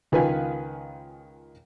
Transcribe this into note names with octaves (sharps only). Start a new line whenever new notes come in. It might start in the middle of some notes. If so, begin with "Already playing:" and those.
C#2 D#3 F4 B4 F5 G#5